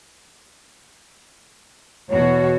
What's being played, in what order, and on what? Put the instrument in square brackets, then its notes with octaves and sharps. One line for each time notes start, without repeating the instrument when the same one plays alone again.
[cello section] E2 B2 F#4 [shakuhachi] C#5